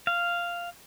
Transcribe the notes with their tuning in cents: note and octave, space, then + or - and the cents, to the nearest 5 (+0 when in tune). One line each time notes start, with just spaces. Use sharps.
F5 -5